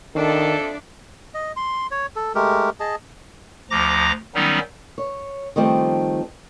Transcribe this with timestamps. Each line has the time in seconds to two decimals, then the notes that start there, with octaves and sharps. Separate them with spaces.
0.15 F2 D#3 D4 A4 D5 E5
1.34 D#5
1.57 C6
1.91 C#5
2.16 A4
2.35 G#3 A3 G4 A#4
2.80 G#4 D#5 A5
3.71 D2 F3 A#5 D6 A#6
4.35 D#3 F#3 G3 B3 C#4 D#4
4.98 C#5
5.56 D#3 F3 G3 A3 C4